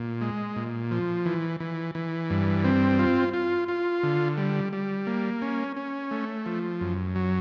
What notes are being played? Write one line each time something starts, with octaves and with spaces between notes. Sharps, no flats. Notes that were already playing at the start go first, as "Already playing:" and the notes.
Already playing: A#2
G#3
A#2
F3
E3
E3
E3
G2
C4
F4
F4
F4
D3
G3
G3
A#3
C#4
C#4
A3
F3
F#2
F#3